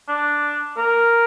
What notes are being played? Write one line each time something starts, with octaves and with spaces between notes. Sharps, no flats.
D4
A#4